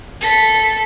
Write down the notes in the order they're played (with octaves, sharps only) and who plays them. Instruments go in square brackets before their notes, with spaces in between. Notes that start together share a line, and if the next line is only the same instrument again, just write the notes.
[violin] A4 B6